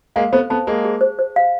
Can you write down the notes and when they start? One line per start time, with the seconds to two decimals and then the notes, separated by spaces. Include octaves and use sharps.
0.16 G#3 A#3 F5
0.33 A3 B3 C5
0.50 A3 B3 A5
0.67 G#3 A#3 G#4
0.85 G#4
1.01 C5
1.19 C5
1.36 F5